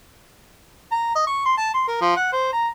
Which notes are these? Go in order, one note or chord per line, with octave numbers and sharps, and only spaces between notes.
A#5
D#5
C#6
C6
A5
C6
A#4
F3
F#5
C5
A#5